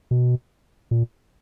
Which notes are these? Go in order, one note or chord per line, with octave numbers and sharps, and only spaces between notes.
B2
A#2